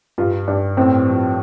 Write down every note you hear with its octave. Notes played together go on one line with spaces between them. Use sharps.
G2 F4
G2 D4
A2 C4
F3